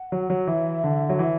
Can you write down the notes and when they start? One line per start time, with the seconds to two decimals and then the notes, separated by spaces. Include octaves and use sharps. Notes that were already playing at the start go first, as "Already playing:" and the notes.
Already playing: F#5
0.12 F#3
0.30 F#3
0.47 E3 E5
0.84 D3
1.09 F#3
1.19 E3 E5